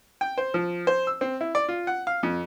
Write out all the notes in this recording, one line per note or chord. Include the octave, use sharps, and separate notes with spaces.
G5
C5
F3
C5
E6
C4
E4
D5
F4
F#5
F5
F2